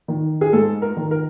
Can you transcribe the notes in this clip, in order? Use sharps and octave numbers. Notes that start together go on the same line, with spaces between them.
D#3
G#4
G#2 A4
A#4
D#3
A#4